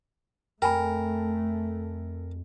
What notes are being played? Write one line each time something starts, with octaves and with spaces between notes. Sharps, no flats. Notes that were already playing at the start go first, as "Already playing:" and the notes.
F2 A3 A#4 G5 G#5 B5